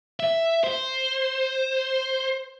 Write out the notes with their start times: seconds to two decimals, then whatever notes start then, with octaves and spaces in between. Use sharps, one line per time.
0.20 E5
0.64 C5